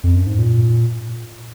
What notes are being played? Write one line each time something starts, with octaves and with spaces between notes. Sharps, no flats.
F2
F#2
G#2
A#2